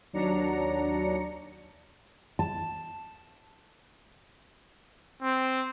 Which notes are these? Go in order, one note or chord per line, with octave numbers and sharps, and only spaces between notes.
D#2 F#3 D4 A#5 C#7
A5
C4